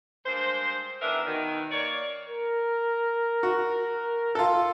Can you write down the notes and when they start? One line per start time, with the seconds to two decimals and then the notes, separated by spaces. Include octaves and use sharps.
0.25 G2 G#3 A#3 C5
1.01 E2 D#3 D4 A#4 B4 E5
1.26 B2 D#3
1.71 A#3 C#5 D5
2.28 A#4
3.43 F#4
4.35 F4 A4